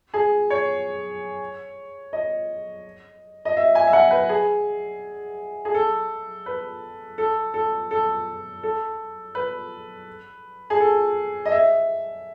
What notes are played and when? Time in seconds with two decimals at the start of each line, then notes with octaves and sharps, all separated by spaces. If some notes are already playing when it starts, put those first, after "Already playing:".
0.14 G#4
0.50 C#5
2.13 D#5
3.45 D#5
3.57 E5
3.75 G#5
3.87 E5
3.93 F#5
4.11 B4
4.29 G#4
5.65 G#4
5.74 A4
6.46 B4
7.18 A4
7.54 A4
7.91 A4
8.63 A4
9.35 B4
10.70 G#4
10.80 A4
11.46 D#5
11.52 E5